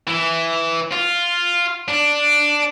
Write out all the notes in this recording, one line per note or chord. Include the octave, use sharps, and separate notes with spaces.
E3
F4
D4